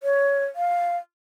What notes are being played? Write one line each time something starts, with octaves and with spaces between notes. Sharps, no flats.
C#5
F5